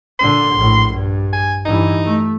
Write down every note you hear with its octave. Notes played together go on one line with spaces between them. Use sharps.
A#2 D3 C6
A#1 A2
G2
G#5
G2 E3 D#4
A3